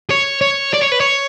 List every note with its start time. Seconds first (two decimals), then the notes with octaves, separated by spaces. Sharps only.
0.10 C#5
0.41 C#5
0.74 D5
0.82 C#5
0.92 B4
1.00 C#5